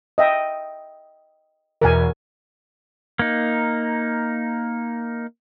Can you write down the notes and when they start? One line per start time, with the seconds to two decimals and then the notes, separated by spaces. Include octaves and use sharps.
0.18 D#5 E5 G5
1.82 E2 B2 E3 A#4 G#5
3.19 A#3 D#4